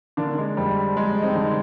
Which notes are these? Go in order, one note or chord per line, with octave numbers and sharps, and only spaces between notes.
D3 A#3 D4
G#3
F2 G3
F2 G#3
C4 D#4
D3